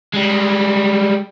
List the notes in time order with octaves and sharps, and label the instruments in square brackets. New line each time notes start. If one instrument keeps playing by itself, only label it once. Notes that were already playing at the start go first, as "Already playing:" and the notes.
[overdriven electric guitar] G3 G#3